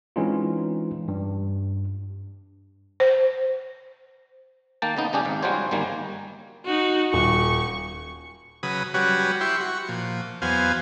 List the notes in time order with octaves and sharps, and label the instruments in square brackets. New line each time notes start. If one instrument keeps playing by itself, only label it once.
[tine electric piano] E3 G#3 C4 C#4 D#4 F4
G2
[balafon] C5
[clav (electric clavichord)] D#3 A#3 G5 A5
C#3 B3 D#4
C#3 G3 C#4 D4 G4 G#4
G#1 G#2
G3 G#3 F4 F#4 C5 C#5
G1 D#3 G3 A#3 G#5
[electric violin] D#4 F#4
[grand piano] D#1 [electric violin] C#6
[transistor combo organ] C#3 F#3 B4 D#6
F#3 G3 C#4 F#4 B4
E4 G4 C6 C#6
F#4 C#6
A#2 F3
E2 F#3 B3 C5 F5 G#5